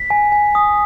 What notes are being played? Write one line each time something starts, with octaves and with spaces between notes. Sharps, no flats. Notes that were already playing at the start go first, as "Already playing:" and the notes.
Already playing: B6
G#5
G#5
D#6